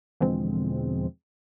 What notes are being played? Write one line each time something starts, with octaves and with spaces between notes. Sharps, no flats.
E2 B2 D3 F3 G#3 C4